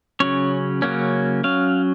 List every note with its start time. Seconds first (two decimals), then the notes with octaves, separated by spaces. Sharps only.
0.20 C#3 F#3 C#4 C#5
0.82 C#3 F#3 A#3 C#4
1.44 F#3 C#4 F5